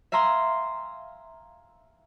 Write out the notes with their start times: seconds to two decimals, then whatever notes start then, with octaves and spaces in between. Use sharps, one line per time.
0.12 E5 F5 G#5 A#5 C6